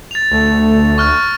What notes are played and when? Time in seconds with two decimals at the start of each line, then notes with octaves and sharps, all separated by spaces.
0.11 A6 F7
0.31 D2 A3
0.98 C#6 F6 F#6